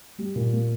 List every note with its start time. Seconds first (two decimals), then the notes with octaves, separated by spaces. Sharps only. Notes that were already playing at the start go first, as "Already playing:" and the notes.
0.18 G3
0.35 A#2
0.53 A#3